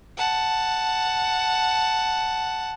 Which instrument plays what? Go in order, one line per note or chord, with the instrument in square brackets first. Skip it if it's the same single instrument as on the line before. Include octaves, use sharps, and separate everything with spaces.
[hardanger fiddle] F#5 A5